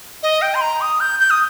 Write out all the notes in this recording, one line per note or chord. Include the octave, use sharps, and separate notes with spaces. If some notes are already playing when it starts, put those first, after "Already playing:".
D#5
G5
C6
A#5
D#6
G6
G6
D#6